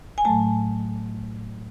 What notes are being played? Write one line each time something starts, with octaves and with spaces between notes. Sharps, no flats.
G#5
A2 F#3 A3 A5